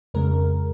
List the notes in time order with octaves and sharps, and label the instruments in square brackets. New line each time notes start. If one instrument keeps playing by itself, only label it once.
[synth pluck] F2 C#3 G#3 A#4